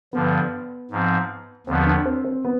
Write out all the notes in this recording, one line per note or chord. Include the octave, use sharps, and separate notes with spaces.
G2 D3 F3 B3
G#2 F3 C4
D#2 D3 F3 B3 C4
D4
C4
C4
B3